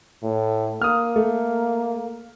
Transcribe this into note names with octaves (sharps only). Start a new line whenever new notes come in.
A2
A#3 D#6 F6
A3